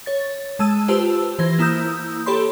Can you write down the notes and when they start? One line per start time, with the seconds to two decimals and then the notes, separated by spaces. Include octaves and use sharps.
0.06 C#5 A6
0.59 G#3 A5 E6 D#7
0.88 F4 G4 B4 C5 A5 E6
1.39 E3 C5 G#6 A#6
1.58 A#3 E4 A#5 D#6 E6 G6
2.26 G4 A4 C#5 B5 C6